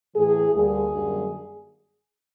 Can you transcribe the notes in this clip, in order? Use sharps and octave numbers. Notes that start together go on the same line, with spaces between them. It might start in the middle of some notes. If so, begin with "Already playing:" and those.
A2 E3 A3 G#4
D2 D3 G3 A#3 G#4
F#2 D3 G3 A#3